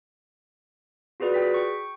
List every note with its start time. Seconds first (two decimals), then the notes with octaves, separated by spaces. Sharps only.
1.20 F4 F#4 G#4 B4 D5
1.34 G#4 G5 B6
1.54 G5 C#6